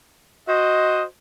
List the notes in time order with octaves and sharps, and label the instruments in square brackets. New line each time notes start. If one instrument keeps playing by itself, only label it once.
[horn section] F#4 C5 D#5